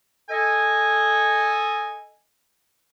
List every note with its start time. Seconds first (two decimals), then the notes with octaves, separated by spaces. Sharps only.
0.30 A4 D#5 G#5